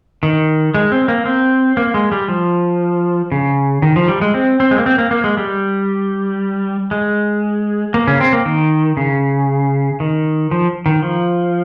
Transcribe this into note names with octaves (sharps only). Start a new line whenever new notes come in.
D#3
G#3
C4
A#3
C4
A#3
G#3
G3
F3
C#3
D#3
F3
G3
G#3
C4
C4
G#3
A#3
C4
A#3
A#3
G#3
G3
G#3
A#3
C#3 C#4
C4
A#3
D#3
C#3
D#3
F3
D#3
F3